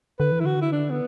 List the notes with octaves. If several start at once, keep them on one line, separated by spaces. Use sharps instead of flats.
D3 B4
E3
E4
D3 F#4
E4
D4
B3